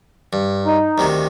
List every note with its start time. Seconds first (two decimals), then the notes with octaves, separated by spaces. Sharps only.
0.33 G2
0.66 D#4
0.98 D2 C3 D#3